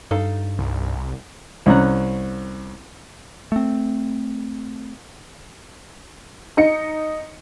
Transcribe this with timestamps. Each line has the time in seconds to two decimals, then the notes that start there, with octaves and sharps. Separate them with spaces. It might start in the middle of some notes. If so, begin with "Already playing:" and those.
0.11 G2 D#4 A4 F5
0.59 C2
1.66 C2 C#4 A#5 F#6
3.52 A3 C4
6.57 D#4 D#5 C#7